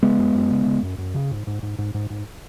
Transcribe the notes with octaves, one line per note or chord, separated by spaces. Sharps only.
C#3 G#3 B3
F#2
F#2
C#3
C#3
F#2
F#2
C#3
G#2
G#2
G#2
G#2
G#2
G#2